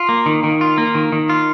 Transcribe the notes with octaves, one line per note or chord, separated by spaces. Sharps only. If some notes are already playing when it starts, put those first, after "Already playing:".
Already playing: F4
A#3
D#3
D#3
F4
A#3
D#3
D#3
F4